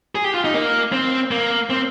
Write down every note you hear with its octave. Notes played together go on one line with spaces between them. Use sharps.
G#4
G4
F4
D#4
A#3
C4
A#3
C4